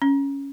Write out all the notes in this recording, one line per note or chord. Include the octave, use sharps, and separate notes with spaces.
C#4